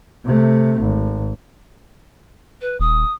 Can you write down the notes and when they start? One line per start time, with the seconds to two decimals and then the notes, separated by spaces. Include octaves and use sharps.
0.25 C3 A3
0.80 G#1
2.61 B4
2.80 D#1 D#6